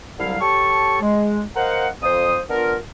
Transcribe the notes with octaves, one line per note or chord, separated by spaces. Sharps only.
C2 D3 F#3 G3 E4 F5
G4 A4 C#5 A5 C#6
G#3
A#4 C5 D#5 F5 F#5
F2 C5 D#6
B3 D4 F4 A#4